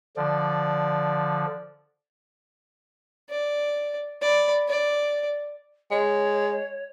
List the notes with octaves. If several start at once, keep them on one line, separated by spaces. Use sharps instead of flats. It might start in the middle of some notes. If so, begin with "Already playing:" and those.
D3 F3 D5
D5
D5 B5
D5
G#3 C#5